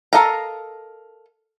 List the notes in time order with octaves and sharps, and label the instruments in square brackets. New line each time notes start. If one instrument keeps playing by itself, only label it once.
[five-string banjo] A4 A#4 D#5 F5 A#5